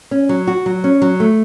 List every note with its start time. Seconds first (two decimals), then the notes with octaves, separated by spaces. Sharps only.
0.11 C#4
0.29 F#3
0.47 F#4
0.66 F#3
0.84 C#4
1.02 F#3
1.20 A3